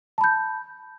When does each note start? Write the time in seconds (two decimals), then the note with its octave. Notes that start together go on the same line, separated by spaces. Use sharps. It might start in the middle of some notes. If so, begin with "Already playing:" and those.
0.18 A5
0.21 B5
0.24 G6